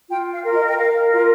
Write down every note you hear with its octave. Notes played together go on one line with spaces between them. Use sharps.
F4 G5
F5
A#4
D#5
G5
A#4 F5
F4